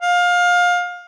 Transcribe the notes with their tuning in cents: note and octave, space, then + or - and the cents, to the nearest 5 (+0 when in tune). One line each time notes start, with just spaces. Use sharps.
F5 +25